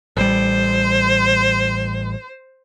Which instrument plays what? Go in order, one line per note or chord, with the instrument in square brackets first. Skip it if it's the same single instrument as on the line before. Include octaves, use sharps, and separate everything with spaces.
[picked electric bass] A1 G3 [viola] C5